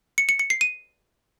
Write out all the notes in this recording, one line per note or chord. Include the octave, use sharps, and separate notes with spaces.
C#7
C#7
C#7
C7
D#7